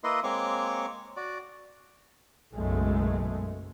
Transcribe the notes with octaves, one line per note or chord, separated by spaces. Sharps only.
A#3 E4 B4 D#5 C6
G#3 A#3 C4 C#5 C#6 D6
F#4 D5
F#1 B1 F#2 B2 G#3 A3